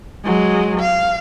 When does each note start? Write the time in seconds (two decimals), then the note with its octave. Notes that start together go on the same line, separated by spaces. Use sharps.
0.25 F#3 G#3
0.80 F5